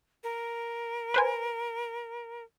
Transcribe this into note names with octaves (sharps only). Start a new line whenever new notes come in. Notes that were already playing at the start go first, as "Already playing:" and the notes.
A#4
B4 C5 G#5